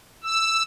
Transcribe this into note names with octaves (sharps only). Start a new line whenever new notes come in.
E6